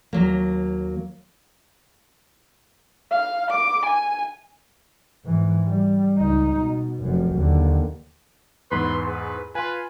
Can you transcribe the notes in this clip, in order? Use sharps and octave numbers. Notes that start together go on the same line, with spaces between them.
D#2 F#3 A#3
F5
D6
G#5
G#2 E3
G3
C#2 D#4
B2
F1 F#2
D#2 D3
E2 G#2 B4 C6
G#4 B4
F4 B4 G#5 C6